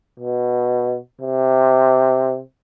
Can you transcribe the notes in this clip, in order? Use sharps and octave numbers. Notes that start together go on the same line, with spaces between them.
B2
C3